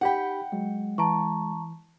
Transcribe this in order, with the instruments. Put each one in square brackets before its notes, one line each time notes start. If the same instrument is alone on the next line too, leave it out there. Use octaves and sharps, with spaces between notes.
[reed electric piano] D#4 G4 B5 [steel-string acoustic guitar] F#5 G5
[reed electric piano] F#3 [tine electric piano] G#3
[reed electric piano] E3 [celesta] A5 A#5 C#6